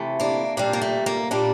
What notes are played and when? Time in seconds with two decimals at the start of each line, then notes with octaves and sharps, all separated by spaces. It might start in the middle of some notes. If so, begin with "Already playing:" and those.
Already playing: C3 E3 A3
0.20 A#3 D4
0.57 A#2 G3 D4 F4
0.73 A#3
0.82 A3
1.06 A#3
1.31 A#2 G3 A#3 D4